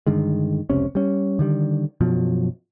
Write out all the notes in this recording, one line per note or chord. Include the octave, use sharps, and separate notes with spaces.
G2 D3 D#3 G#3
F1 C#2 C3 C#4
G3 C#4
D3 D#3 G3
F#2 B2 F3 F#3